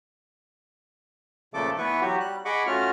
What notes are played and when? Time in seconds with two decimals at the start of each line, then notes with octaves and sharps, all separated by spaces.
1.54 A#2 C#3 F3 A3 A4 D6
1.78 E3 B3 E4 B4 C#6
2.01 F#3 F#4 G4
2.20 G3 F#6
2.45 G#4 D#5 F#5 B5 C#6 D6
2.67 A3 C#4 F4 F#4 F6